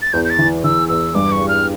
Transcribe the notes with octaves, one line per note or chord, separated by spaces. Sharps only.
A6
E2 G6
G6
A6
E3
E3 E6
E2 E6
G2 D6
C#6
G3
F6